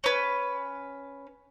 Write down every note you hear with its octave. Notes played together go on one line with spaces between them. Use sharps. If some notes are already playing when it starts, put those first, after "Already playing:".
C#4 B4